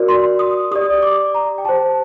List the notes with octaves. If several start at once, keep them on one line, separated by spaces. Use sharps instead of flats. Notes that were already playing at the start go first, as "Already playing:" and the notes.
Already playing: F#4 A#4 D5
C6
D#6
G4 D5 D#6
D6
A#5
G5
G4 C5 A5